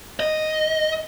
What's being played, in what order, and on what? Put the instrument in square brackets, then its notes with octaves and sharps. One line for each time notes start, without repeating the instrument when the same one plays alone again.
[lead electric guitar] D#5